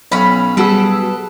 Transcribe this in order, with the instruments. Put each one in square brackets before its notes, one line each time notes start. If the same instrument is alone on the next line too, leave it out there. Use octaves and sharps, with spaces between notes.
[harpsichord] B1 [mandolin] C#4 F5 B5
[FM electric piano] G3 F#4 E6 [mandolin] G#4 A4 B4